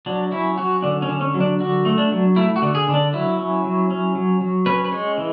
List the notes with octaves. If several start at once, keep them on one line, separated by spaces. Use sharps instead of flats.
F#3 D4
C#4 E4
F#3 F#4
D3 D4
C#4
D3
C#4
F#3
D4
D3 F#4
A3
D4
F#3
A3 E4
F#4
D3
G#4
D3
D4
F#3 E4
C#4
F#3
C#4
F#3
F#3
C#4 B4
B4
G#3 C#5
E3